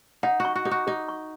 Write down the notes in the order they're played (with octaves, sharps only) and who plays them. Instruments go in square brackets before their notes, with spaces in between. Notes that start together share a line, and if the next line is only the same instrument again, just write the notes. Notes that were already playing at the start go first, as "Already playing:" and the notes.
[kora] D#4 [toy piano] F#5
[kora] F#4
[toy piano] C#6
[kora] F#4
[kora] D#4 [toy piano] G#4
[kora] F#4
[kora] D#4 [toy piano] G#4
[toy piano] C#6